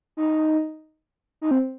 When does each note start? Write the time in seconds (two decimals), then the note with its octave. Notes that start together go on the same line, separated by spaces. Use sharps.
0.17 D#4
1.41 D#4
1.51 C4